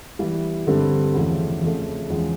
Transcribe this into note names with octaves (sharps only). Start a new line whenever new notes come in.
E3 G3 B3
G2 D3 G3 C4
E2 C#3 F3 A3
F2 C#3 F3 A3
E2 C#3 F3 G#3